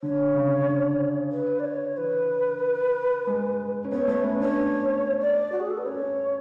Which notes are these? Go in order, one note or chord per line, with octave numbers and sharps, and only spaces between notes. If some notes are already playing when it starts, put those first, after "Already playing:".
D3 C#5
C#3
D3
B4
D5
C#5
E3 B4
G#3
C#4
B3 C#5
A3 C#5
C#4 B4
D4 C#5
D5
F#4
G#4
A4
B4
C#4 C#5
C#4